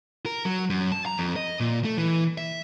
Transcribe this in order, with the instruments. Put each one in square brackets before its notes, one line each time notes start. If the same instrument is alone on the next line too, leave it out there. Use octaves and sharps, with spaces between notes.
[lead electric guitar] A#4
F#3
F#2
A5
A#5
F2
D#5
A#2
A3
E3
E5